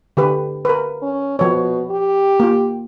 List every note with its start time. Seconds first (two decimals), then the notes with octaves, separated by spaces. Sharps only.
0.17 D3 G4 B4
0.65 A#4 B4
1.02 C#4
1.39 B2 F3 C#5
1.91 G4
2.40 A#3 F4